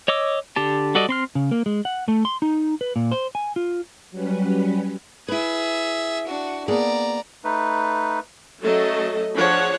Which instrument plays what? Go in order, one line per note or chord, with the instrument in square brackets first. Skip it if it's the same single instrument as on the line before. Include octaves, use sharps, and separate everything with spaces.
[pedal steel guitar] C#5 D#5 D6 E6
D3 G4 A5
G3 F#4 A4 D5 D#5
C4 C6 F6
[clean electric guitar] C#3
A#3
G#3
F#5
A3
C6
D#4
B4
A#2
C5
G#5
F4
[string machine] F#3 G3 C#4 B4
[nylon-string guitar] E4 B4 [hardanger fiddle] G#4 E5
[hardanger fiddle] D4 F#4
[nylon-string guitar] A#3 B3 G#4 [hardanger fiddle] D5 A#5
[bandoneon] A3 D#4 B4
[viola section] F#3 A3 C#4 A4 D#5
F3 D4 G#4 C#5 F#5